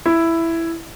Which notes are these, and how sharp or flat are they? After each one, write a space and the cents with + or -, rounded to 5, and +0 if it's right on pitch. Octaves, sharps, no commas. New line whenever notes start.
E4 +5